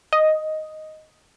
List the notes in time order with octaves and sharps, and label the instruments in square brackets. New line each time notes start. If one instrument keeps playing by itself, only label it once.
[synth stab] D#5